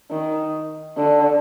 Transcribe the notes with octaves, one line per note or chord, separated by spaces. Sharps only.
D#3
D3